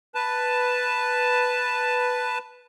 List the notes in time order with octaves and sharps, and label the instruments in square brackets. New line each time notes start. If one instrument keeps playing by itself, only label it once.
[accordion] B4 A5